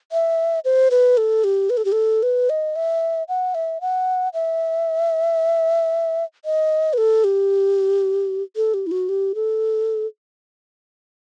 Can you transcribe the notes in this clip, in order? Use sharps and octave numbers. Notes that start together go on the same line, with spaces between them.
E5
C5
B4
A4
G4
B4
A4
G4
A4
B4
D#5
E5
F#5
E5
F#5
E5
D#5
B4
A4
G4
A4
G4
E4
F#4
G4
A4